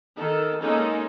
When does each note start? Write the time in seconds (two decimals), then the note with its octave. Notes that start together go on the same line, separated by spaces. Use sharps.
0.17 D#3 A4
0.60 G#3 A#3 C#4 D#4 A4